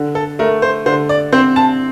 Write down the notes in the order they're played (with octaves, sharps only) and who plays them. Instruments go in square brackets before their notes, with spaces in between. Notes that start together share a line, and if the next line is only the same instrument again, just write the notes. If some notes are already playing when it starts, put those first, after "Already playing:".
Already playing: [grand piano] D3
[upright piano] A4
[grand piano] A3 [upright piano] A#4
[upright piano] C5
[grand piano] D3 [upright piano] C5
[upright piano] D5
[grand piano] C4 [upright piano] C5
[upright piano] A5